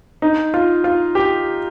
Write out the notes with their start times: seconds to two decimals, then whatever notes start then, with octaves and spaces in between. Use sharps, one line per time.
0.22 D#4
0.54 F4
0.84 F4
1.15 G4